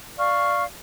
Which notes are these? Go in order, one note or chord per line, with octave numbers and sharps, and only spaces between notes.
D5 F5 C#6 F6